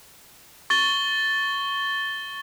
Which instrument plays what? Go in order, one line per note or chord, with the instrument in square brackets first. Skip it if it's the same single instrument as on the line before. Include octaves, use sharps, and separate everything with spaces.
[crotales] C#6 A6 G7